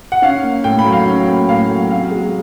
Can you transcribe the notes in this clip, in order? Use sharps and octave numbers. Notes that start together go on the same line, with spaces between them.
F#5
C#4 F5
A#3
A2 G5
B5
F#3
F5
C#4
A#3
A2 F5
F#3
C3 F5
G#3